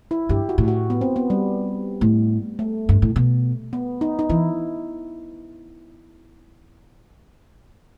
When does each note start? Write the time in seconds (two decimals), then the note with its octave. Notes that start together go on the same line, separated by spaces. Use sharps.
0.11 E4
0.29 G2 G4
0.49 F#4
0.58 A2
0.68 F#4
0.90 B3
1.01 C4
1.16 B3
1.30 G3
2.01 A2
2.59 A3
2.89 G2
3.02 A2
3.16 B2
3.73 B3
4.01 D#4
4.19 D#4
4.29 E3 E4